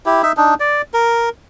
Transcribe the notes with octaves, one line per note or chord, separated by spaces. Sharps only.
E4 G4
D#4 E5
D4 D#4
D5
A#4